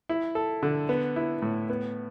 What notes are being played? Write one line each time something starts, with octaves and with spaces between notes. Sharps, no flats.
E4
A4
D3
B3
E4
A2
B3